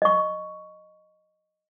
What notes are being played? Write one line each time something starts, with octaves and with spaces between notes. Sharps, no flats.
D#5 C#6